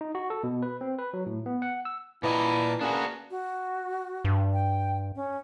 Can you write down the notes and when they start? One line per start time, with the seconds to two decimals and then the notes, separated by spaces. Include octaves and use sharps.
0.01 D#4
0.15 F#4
0.30 A4
0.43 B2
0.62 B4
0.81 C4
0.99 B4
1.14 F#3
1.26 A2
1.46 B3
1.62 F#5
1.85 E6
2.23 A#2 E3 E4 D#5 A5 A#5 D6
2.81 A#3 C#4 D4 F#4 G#4 B4
3.31 F#4
4.25 G2
4.54 G5
5.16 C#4